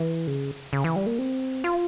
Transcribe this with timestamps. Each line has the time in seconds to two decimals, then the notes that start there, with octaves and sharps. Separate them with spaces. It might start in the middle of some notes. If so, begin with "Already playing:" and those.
Already playing: E3
0.27 C#3
0.73 C#3
0.84 E3
0.96 G3
1.06 A#3
1.19 C4
1.64 F4